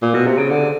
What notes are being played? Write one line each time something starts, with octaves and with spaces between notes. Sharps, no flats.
A#2
B2
C3
C#3
D3